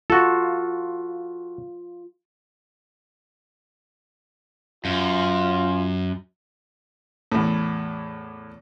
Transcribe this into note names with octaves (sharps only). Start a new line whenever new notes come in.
F4 F#4 A4
F#2 F4
E2 A2